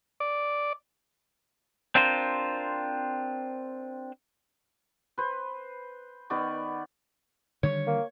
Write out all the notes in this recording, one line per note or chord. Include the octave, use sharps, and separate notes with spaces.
D5
C4 D4 F4 A#4 C5
B4 C5
D#3 B3 D5 C#6
D3 D#3 G3 C#5
A#3